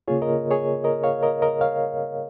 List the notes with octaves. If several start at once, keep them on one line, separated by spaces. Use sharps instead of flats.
C#3 A#3 F4 G#4 C#5
A#4 D#5
G#4 C#5
A#4 D#5
C#5 F5
A#4 D#5
A#4 D#5
C#5 F5